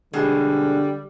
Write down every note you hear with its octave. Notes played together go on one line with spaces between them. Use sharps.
B2 D3 G3 G#3